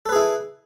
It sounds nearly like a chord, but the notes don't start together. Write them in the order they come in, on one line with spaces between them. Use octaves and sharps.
A4 B4 G#4 E4